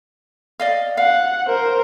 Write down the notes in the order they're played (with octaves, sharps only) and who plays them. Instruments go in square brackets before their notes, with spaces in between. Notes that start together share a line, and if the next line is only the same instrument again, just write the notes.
[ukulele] D5 D#5 F5
[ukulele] F5 [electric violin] F#5
[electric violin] A#4 C5